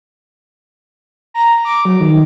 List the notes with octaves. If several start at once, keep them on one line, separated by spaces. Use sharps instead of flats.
A#5
D6
F#3
D#3